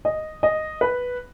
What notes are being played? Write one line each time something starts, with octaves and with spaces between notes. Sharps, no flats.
D#5
D#5
B4